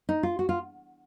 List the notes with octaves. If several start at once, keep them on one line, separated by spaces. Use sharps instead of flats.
D#4
F4
F#4
F4